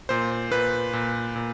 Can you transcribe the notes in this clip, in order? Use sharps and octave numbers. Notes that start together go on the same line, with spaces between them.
A#2 C5
A#2 B4
A#2
A#2